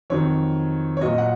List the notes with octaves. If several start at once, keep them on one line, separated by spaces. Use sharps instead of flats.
F2 D#3 F#3 C#5
C#5
A#2 F#3 D#5
F#5